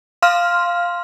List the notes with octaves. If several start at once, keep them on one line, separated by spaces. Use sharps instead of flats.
F5 C6 F6